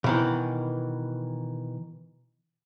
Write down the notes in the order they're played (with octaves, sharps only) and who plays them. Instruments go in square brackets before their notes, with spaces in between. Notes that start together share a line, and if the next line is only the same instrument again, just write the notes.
[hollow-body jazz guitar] B2 D#3 E3